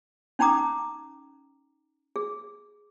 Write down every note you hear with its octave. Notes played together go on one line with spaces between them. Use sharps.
C#4 D#4 G5 A#5 D6 D#6
G#4